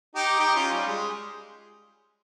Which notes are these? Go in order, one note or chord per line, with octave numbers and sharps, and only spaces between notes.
D#4 G4
D#4 G4
C#4 F4
G3
G#3